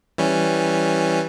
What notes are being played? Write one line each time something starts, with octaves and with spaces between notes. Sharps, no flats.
E3 G3 C#4